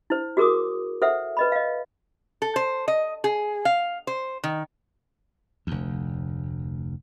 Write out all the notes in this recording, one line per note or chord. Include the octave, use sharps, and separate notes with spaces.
E4 C5
F#4 G#4 A#4 D6 D#6
A4 C5 E5 F#5
B4 D#5 B5
D#5 F5
A4
C5
D#5
G#4
F5
C5
D#3
F1 D2